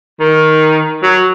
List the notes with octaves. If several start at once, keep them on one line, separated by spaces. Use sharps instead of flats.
D#3
F#3